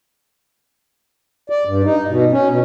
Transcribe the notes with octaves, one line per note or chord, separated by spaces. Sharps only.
D5
G2
D#4
B2
C#4
B2